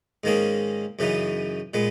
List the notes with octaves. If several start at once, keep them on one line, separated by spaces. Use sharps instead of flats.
G#2 D#3 A#3 C#4 G#4
F#2 C#3 E3 B3 D#4
A#2 G#3 B3